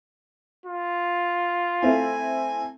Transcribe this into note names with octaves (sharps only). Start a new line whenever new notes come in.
F4
A3 C4 E4 G#5